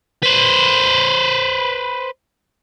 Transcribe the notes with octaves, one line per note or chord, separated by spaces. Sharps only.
B4 C5